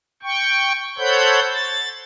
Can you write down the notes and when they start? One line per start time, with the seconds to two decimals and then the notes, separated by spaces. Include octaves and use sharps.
0.23 G5 C#6
0.98 A4 C5 C#5 F#5 B5 G6
1.53 A6